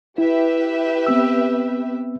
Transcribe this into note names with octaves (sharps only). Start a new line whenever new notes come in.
E4 G4 B4 E5
B3 C4 E6